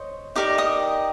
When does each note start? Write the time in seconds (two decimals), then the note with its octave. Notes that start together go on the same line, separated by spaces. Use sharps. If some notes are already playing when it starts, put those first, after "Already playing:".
Already playing: C5 C#5 D#5
0.36 D#4 G4 A#4 D5 D6
0.58 D#5 D#6